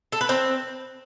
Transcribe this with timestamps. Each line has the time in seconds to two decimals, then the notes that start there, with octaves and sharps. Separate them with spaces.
0.12 A4
0.21 B4
0.29 C4